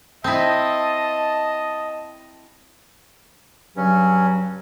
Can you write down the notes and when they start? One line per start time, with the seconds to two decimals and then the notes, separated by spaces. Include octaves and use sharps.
0.24 C4 E4 D#5 A5
3.77 G2 C#3 F#3 C#4